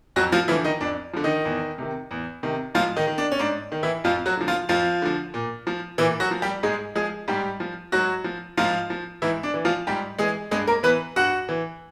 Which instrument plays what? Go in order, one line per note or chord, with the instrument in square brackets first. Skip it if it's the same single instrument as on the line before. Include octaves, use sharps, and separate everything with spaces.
[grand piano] F2 F#3 F#4
F3 F4
E3 F3 E4
D3
D#3 D#4
F2 D4
D3 F3
D#3 D#4
E2
C3 D#3
E2
C3 D#3
G#2 F3 F4
D#3 D#4
D#3
D4
C#4
G#2 D4
D#3
E3 E4
F2 F3 F4
F#3 F#4
D3 F3
F3 F4
F2 F3 F4
D3 F3
A#2
F3
A#2 E3 E4
F#3 F#4
F3
G3 G4
G#2 G#3 G#4
F3 G#3 G#4
G#2 G3 G4
F3
G#2 F#3 F#4
F3
G#2 F3 F4
F3
G#2 E3 E4
D4
E3
F3 F4
G#2 G3 G4
E3 G#3 G#4
G2 G#3 G#4
A#3 A#4
E3 B3 B4
G2 F#4 F#5
E3